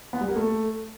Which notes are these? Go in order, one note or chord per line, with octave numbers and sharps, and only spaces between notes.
B3
G3
A#3
A3